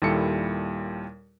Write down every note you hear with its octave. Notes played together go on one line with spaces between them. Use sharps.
D#2 A#2 G3 E4 A4 C#7